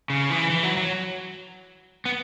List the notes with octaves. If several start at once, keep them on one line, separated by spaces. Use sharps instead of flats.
C#3
E3
E3
F#3
F#3
B3